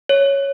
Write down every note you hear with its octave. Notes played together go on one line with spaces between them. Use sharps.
C#5